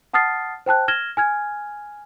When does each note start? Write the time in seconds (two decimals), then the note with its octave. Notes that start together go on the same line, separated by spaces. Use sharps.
0.14 F#5 A5 D#6 F6 A6 C7
0.66 C5 G5 A5 F#6
0.88 F6 G#6 A#6 E7 G7
1.17 G#5 F6 G#6